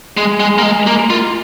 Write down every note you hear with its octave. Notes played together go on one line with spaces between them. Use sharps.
G#3
G#3
A#3
G#3
A#3
F4